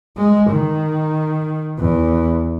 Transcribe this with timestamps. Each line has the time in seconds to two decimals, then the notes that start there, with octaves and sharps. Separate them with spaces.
0.17 G#3
0.50 D#3
1.79 E2